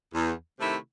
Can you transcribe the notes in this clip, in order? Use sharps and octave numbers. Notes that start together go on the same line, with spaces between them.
E2
C3 D#3 A3 E4